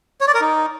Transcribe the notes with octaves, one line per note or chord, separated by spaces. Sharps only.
C#5
D5
A#4
D#4